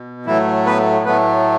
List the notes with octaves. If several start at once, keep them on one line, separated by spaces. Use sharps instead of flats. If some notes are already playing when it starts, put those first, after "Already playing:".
Already playing: B2
A2 E3 F#3 A3 E4
B3 B4
A2 F#3 A3 B3 B4